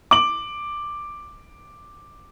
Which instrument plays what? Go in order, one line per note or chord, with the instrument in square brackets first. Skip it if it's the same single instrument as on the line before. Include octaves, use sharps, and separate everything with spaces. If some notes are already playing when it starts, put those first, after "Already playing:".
[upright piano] D6 F#7